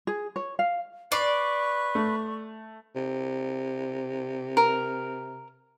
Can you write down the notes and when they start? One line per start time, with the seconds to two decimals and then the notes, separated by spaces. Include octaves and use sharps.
0.07 G#4
0.36 C#5
0.59 F5
1.12 B4 D5 C#6 C7
1.95 A3
2.96 C3
4.57 A#4